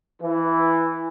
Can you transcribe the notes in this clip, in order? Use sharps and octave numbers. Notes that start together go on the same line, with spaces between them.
E3